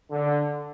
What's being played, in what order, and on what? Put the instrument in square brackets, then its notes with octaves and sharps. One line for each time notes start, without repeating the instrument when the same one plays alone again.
[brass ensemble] D3